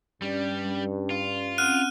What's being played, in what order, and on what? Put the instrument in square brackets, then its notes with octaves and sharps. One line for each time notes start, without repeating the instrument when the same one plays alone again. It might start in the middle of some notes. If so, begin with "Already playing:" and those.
[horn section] G2 [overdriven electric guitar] G3 [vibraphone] C#4 D5
[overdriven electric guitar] F4
[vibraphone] C4 C#4 F#5 [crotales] F6 F#6 D#7